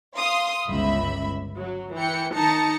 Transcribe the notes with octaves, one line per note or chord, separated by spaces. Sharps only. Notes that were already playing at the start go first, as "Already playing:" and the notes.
F5 C6 D#6
G1 C#2 E5 B5
F#3
E3 G5 C#7
D#3 D#4 A5 A#6 C#7